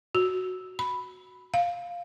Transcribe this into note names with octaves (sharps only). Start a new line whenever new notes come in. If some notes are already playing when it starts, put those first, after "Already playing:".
F#4
B5
F5